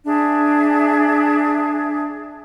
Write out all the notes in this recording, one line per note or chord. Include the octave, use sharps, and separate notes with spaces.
D4 G#4 E5